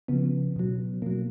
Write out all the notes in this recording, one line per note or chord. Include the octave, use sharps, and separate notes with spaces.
C#3 F3 B3
B2 F#3
B2 F#3 A#3